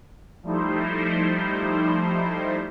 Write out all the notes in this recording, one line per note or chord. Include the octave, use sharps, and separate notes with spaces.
F3 G3 A3 D#4 E4 C5